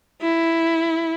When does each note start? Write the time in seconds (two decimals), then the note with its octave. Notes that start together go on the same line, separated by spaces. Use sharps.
0.22 E4